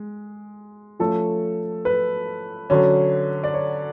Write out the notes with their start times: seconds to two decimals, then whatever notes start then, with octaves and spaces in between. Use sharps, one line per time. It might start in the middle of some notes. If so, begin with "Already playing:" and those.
Already playing: G#3
1.00 F3 A3 C#4 A4
1.85 B4
2.70 D3 F#3 C#4
3.44 D5
3.54 C#5